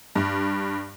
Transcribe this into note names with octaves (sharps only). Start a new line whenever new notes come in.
G2